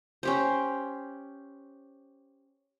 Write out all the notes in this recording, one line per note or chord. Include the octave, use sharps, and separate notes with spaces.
C#4 G4 C5